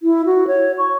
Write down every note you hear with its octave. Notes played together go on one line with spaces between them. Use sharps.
E4
F#4
C#5
C#6